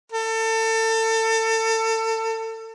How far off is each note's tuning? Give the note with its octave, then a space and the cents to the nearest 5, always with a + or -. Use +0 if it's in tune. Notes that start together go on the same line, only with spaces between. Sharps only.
A4 +30